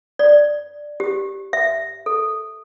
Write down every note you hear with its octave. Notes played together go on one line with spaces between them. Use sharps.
D5
G4
E5
A4